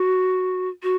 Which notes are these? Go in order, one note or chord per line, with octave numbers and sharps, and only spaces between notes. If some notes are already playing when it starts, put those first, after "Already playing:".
Already playing: F#4
F#4